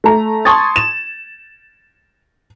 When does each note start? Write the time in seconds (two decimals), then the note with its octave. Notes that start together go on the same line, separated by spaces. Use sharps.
0.04 A3 A#5
0.45 A5 C6 C#6 D#6 G#6 A6
0.76 E7